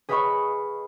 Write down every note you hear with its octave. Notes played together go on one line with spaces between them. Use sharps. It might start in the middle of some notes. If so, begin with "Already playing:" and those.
G#4 B4 D#5 F5 B5 C#6